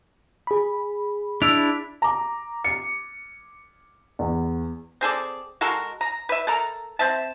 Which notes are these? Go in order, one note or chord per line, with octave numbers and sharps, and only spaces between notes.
G#4 B5
D4 E4 E6 D7 F7
A#5 D6
C#7
E2
C4 G#4 A4 D5
G#3 F#4 A4 A#4
A#5
B4 E5
A4 A#4 A#5
C4 E5 A5